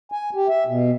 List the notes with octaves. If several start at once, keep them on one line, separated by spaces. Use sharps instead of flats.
G#5
G4
E5
B2